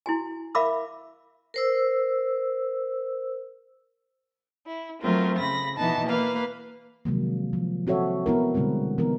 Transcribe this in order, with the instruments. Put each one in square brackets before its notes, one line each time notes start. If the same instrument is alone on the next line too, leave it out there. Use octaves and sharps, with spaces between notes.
[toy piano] E4 F#4 G#5
A#4 E5 F5 B5 D6 E6
[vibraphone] A#4 C5 E6
[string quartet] E4
F#3 A3 C4 F4 A#4
C#3 B5 A#6
B2 E3 B3 D#4 A5
A#3 B4 F5
[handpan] C3 D#3 F3 F#3 G#3 A#3
F3
C4 F#4 A4 C#5 E5
B3 E4 A#4
B2 D3 G3 G#3 C4
E3 B3 D#4 A#4